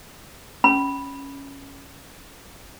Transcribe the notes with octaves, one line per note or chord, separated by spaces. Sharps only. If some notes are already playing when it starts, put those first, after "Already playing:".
C#4 B5